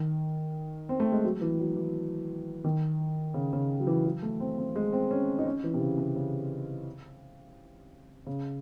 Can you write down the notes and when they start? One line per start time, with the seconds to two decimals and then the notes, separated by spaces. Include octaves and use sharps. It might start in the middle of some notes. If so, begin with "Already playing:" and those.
Already playing: D#3
0.89 C4
1.00 A3
1.12 G#3
1.24 F#3
1.41 E3
1.59 F#3
1.76 E3
2.64 D#3
3.34 C#3
3.53 C#3
3.80 F#3
3.87 E3
4.06 F#3
4.23 A3
4.40 C4
4.58 C4
4.76 G#3
4.93 C4
5.11 C#4
5.39 D#4
5.46 C#4
5.64 E3
5.74 C3
5.81 C#3
5.98 C3
6.16 C#3
8.27 C#3